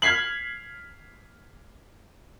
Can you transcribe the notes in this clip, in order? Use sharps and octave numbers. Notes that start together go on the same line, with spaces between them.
F6 G#6 B6 C7 F#7